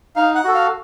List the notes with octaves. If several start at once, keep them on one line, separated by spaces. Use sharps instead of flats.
D#4 F5
F#5
F#4 A4
F5